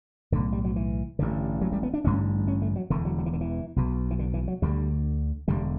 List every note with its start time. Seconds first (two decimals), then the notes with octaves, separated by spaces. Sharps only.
0.32 B1 A2 D3
0.52 G3
0.64 F#3
0.76 E3
1.19 A1 G2 D3
1.61 F#3
1.72 G3
1.83 B3
1.94 D4
2.04 A1 G2 D3 C#4
2.48 C#4
2.62 A3
2.76 F#3
2.90 E1 E2 D3 E3
3.05 F#3
3.18 F#3
3.26 E3
3.33 D3
3.41 E3
3.76 B1 B2
4.11 E3
4.19 D3
4.34 E3
4.48 F#3
4.62 D2 D3 G3
5.48 E1 D2 D3 G3